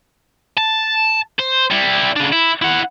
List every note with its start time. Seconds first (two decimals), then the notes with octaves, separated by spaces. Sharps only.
0.57 A5
1.39 C5
1.71 G3 E4
2.16 C#3 D4
2.33 E4
2.62 E4 F#5